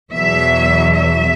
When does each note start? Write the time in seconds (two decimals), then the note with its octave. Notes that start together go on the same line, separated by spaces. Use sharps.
0.13 E2 B2 F#3 E5
0.96 E5